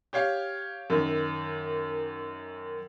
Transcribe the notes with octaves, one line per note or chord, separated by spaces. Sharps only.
G4 C#5 F5
F#2 D#3